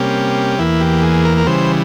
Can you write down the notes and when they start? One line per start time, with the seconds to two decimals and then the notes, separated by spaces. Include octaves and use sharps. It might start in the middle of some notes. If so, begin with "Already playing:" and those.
Already playing: C3 G3 A#3 C#4 G4
0.59 E2 E3 A#3 E4
0.81 G4
1.03 G#4
1.25 A#4
1.37 A#4
1.46 C#3 E3 G3 C5